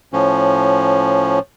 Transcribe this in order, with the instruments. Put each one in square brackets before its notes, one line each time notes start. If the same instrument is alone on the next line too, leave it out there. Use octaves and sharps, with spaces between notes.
[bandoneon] A2 F3 C#4